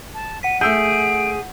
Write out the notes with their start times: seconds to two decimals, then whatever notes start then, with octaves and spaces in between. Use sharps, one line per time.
0.14 A5
0.43 F#5 B6 D#7
0.61 A3 G#4 E6 G6 D7